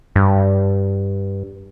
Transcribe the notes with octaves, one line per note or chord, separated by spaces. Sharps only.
G2